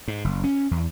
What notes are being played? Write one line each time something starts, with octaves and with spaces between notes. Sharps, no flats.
G#2
F#1
C#4
E2